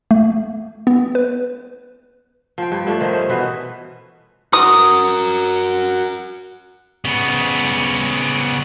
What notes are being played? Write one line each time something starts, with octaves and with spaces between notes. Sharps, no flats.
A3
B3
B4
F3 C5 G5
G2
G2 F3 A3 D4
D#3 C5
C#4 C5
B2 E3 F#4 B4
F#4 A#4 D#6
C#3 B3